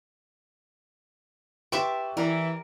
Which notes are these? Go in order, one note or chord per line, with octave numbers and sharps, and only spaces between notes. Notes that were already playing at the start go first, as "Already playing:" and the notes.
G4 B4 E5 G5 A5 C6 C#6
E3 A#4 D5